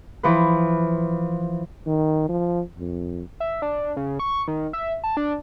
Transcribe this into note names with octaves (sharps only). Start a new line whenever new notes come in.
E3 F3 B4
D#3
F3
F2
E5
D4
C#3
C#6
D#3
E5
A5
D4